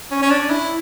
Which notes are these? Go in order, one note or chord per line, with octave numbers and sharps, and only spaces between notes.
C#4
C#4
D4
E4